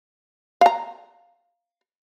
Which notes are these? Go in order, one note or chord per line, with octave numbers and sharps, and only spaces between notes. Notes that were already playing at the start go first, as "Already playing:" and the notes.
F5 A#5